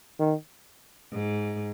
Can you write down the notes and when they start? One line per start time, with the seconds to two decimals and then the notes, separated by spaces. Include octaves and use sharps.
0.19 D#3
1.12 G#2